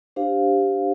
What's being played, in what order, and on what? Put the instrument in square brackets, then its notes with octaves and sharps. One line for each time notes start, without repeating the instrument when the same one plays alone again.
[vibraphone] D4 G4 C5 F5